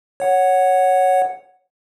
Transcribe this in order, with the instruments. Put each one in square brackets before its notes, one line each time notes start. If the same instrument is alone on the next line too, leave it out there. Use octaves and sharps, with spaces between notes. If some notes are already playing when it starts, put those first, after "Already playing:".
[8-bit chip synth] C#5 F#5